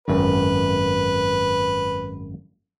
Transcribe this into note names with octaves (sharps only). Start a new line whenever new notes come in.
G#1 F#2 B4